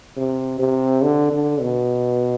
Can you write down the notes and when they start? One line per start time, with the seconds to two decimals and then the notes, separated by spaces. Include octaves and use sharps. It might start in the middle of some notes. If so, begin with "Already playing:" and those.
0.17 C3
0.60 C3
1.04 D3
1.32 D3
1.61 B2